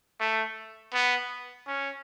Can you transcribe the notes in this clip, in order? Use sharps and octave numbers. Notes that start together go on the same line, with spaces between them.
A3
B3
C#4